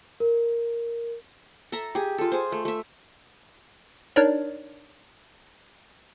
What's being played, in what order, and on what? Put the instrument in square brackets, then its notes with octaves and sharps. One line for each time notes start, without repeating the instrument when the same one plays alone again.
[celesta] A#4
[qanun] A4 E5 A#5
G4 G#4
F4 A4
G#4 C5
A3
A3 E5
[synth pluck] D4 D#4 A#4 C#5 D5